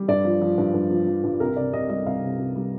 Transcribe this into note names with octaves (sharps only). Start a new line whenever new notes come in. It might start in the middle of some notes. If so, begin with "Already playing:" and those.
Already playing: G3
G2 D5
F3
F3
G2
G2
F3
F3
G2
C2 A#4
C3 D5
C2 D#5
G3 D#5
C2 F5
C3
C2
G3